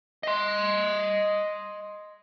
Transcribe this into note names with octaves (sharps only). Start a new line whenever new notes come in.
D#5 C6